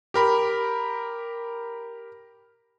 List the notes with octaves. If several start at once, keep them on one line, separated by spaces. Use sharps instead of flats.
G4 A#4 B5